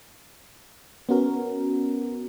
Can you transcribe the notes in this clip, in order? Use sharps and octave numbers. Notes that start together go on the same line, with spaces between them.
B3 C#4 F#4 A#4